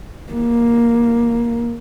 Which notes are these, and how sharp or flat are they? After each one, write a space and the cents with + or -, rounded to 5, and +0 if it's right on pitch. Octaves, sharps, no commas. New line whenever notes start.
A#3 +10